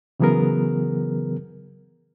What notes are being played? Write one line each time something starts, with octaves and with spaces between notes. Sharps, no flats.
C#3 E3 F#3 B3 G#4 A#4